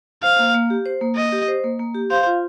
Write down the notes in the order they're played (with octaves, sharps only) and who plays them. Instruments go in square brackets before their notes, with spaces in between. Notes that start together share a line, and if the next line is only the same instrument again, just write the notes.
[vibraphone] C5 [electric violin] F5
[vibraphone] A#3
A#3
G4
C5
A#3
[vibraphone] A#3 [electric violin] D#5
[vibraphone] G4
C5
A#3
A#3
G4
[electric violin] C5 [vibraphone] F5
[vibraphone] F4